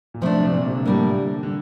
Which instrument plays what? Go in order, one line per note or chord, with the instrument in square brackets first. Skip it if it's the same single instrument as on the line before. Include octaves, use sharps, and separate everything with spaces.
[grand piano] A#2
[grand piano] C3 [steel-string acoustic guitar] F3 A3 D4
[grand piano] C3
C3
A#2
C3
D3
[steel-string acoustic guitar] A2 G3 A#3
[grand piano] D3